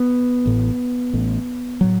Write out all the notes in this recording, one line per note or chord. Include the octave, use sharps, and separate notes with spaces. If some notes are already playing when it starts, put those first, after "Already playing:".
Already playing: B3
A1 A2
A1 A2
A2 F#3